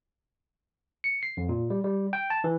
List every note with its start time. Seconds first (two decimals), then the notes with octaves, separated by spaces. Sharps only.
1.04 C#7
1.23 C7
1.37 F2
1.49 A#2
1.70 G3
1.84 G3
2.13 G5
2.30 A5
2.44 E3